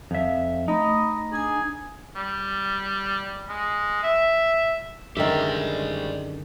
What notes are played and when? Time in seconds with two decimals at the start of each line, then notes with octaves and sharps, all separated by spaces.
0.11 F2 E5 F5
0.68 A3 D#4 D#5 B5
1.33 D4 G#4 G#5
2.16 G3
3.49 G#3
4.03 E5
5.17 F#2 D3 D#3 G#3 G4 C5 D5 E5